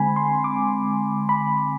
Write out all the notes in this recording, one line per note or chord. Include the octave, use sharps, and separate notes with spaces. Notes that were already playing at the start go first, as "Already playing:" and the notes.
Already playing: D3 G#3 C4 G#5 B5
C6
D6
B5